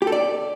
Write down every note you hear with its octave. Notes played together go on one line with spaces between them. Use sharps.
G4
A4
D5